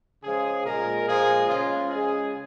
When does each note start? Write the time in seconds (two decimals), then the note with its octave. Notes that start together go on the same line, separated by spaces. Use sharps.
0.23 C#3 F3 G#3 G#4
0.65 A#2 G#3 A#4
1.07 A#2 F3 G#3 G#4
1.48 C#3 F3 G#3 F4
1.90 C#3 G#3 G#4